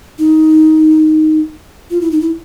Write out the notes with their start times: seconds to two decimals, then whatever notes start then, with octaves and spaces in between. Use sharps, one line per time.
0.19 D#4
1.91 F4
2.01 E4
2.11 D#4
2.21 E4